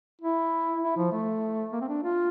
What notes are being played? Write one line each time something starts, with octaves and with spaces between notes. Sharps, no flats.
E4
E4
F3
A3
A#3
C4
D4
F4